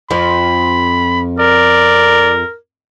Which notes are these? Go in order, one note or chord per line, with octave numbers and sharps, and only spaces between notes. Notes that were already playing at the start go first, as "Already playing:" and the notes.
F2 F3 B5
A#4 D5